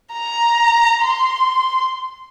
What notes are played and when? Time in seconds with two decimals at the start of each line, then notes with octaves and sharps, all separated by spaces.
0.13 A#5
1.02 C6